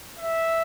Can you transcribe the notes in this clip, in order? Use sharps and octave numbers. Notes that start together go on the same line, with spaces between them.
E5